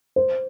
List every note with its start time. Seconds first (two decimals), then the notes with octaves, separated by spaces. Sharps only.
0.16 C5